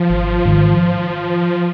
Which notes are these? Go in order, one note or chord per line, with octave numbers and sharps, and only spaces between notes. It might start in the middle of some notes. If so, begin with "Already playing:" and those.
Already playing: F3
G#1
G#2 D#3